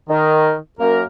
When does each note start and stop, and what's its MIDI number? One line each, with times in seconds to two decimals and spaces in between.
0.09 0.54 51
0.80 1.04 42
0.80 1.04 58
0.80 1.04 70